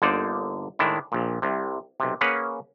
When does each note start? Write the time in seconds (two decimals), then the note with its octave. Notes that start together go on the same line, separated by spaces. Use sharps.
0.02 G1 D3 A#3 D#4 C5 D5
0.79 A2 D#3 G#3 D4 E4
1.12 A#1 A#2
1.42 C2 C3
2.00 B1 C3
2.21 A#3 C#4 G#4 B4 C#5 F#5